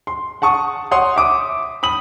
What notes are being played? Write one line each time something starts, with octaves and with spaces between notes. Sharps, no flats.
C6
F#5 A5 C#6 D#6
C#5 F#5 C6 D#6
E5 D6 D#6
B5 D#6 F#7